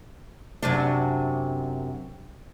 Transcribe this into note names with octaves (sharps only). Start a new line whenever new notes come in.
F#2 C3 D4